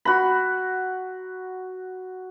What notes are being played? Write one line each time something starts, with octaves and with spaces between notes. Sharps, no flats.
F#4 B5